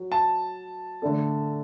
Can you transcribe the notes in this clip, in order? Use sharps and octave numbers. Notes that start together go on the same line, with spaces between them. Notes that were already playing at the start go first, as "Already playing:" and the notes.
Already playing: F#3
A5
D3 A3 D4 A4